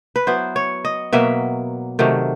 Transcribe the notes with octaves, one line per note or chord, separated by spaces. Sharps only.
B4
F#3 B3 E4 C5
C#5
D#5
B2 F#3 A#3 E5
C3 D#3 F#3 A3